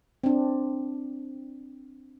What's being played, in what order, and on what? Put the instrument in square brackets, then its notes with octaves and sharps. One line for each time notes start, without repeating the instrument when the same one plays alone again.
[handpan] C4 D4